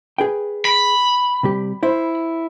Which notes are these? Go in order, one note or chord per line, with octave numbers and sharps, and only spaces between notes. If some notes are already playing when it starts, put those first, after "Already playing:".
G#4 B4 G5
B5
C3 G3 G4
E4 C5